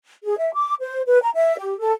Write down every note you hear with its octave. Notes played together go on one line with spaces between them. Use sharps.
G#4
E5
D6
C5
B4
A#5
E5
G4
A4